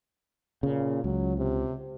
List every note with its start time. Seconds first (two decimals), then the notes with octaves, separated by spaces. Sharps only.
0.63 A#2 C#3
1.04 C#2 F#3
1.37 C3